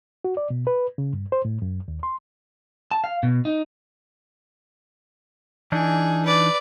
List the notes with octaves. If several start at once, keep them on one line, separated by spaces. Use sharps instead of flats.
F#4
D5
B2
B4
C#3
G2
C5
A2
F#2
D#2
C6
A5
F5
B2
D#4
E3 D4 D#4 G#4
B4 D5